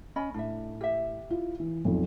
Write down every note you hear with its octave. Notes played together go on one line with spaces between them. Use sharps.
C#4 D#5 B5
A2 D4 E5
G4 E5
E4 F4
E3
B1 F2